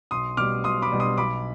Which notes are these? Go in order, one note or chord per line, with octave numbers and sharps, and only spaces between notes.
B1 C6 D#6
B2 G3 D6 F6
B1 C6 D#6
B5 D6
B2 G3
C6 D#6
B1 B5 D6